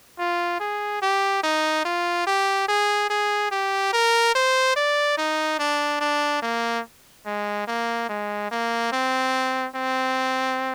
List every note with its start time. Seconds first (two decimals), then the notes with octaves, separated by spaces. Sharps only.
0.19 F4
0.60 G#4
1.02 G4
1.43 D#4
1.85 F4
2.27 G4
2.68 G#4
3.10 G#4
3.51 G4
3.93 A#4
4.35 C5
4.76 D5
5.18 D#4
5.59 D4
6.01 D4
6.42 A#3
7.26 G#3
7.68 A#3
8.09 G#3
8.51 A#3
8.92 C4
9.76 C4